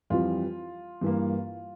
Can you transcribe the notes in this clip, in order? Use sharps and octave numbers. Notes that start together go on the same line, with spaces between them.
F2 E3 G3 F4
G2 E3 A#3